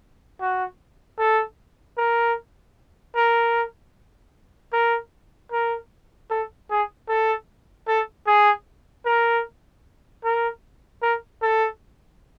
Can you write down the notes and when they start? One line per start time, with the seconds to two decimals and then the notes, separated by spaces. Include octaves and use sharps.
0.40 F#4
1.18 A4
1.97 A#4
3.15 A#4
4.73 A#4
5.52 A#4
6.30 A4
6.70 G#4
7.09 A4
7.88 A4
8.27 G#4
9.05 A#4
10.24 A#4
11.02 A#4
11.42 A4